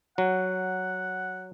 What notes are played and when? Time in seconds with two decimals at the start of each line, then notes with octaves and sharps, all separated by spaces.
0.18 F#3 F#5